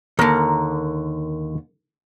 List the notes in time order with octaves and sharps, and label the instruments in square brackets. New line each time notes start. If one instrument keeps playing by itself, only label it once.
[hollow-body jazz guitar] D#2 D3 [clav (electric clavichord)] A#4